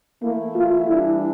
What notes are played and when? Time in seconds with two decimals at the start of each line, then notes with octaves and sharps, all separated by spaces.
0.23 E3 A3 A#3 E4
0.55 F4
0.88 E3 G3 D4 E4